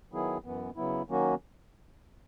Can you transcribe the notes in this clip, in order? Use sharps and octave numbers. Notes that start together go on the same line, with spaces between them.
D#3 F#3 B3 E4 G#4
F#2 E3 B3
C#3 F#3 B3 E4
D#3 F#3 A#3 C#4 F#4